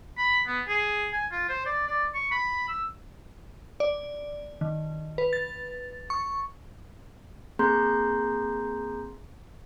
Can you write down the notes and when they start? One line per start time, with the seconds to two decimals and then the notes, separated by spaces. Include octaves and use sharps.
0.18 B5
0.47 B3
0.68 G#4
1.13 G#5
1.32 F4
1.49 C5
1.66 D5
1.88 D5
2.14 C#6
2.31 B5
2.68 E6
3.80 D5
4.61 D#3
5.18 B4
5.33 A6
6.10 C#6
7.59 A#3 C4 G#4 A#5 C6 G6